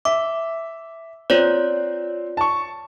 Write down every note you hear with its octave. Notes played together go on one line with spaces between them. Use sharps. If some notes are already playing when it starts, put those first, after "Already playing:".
E5 D6
C4 F4 C#5 D5
A5 C#6